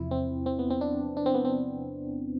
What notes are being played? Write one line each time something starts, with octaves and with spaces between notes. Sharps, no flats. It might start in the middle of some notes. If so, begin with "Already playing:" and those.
Already playing: E2 C3 F3 E4
C4
C4
B3
C4
D4
D4
C4
B3
C4